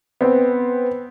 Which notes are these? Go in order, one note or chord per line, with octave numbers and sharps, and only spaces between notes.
B3 C4